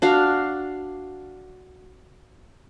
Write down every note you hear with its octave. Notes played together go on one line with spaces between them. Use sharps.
D4 F#4 F5